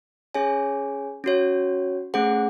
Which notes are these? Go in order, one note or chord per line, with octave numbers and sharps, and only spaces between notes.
C#4 G#4 C#5 G#5
C#4 F#4 C#5
A3 C#4 G#4 C5 F#5